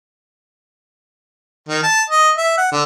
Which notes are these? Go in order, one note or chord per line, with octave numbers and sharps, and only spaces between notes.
D#3
A5
D#5
E5
F#5
D3